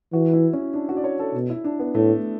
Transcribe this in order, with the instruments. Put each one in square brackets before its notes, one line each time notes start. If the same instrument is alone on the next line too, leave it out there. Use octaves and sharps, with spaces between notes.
[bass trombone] E3 [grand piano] F#4
[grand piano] E4
C#4
D4
F#4
D5
C#5
A4
[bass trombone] B2
[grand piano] E4
D4
B3
[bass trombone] A2 [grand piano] A3